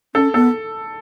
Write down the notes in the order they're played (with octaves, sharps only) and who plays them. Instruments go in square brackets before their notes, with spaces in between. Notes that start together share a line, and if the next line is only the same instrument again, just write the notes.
[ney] C#4 [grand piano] A4
[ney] B3 [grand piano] A4